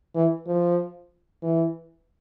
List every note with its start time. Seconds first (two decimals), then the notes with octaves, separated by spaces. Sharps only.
0.15 E3
0.47 F3
1.43 E3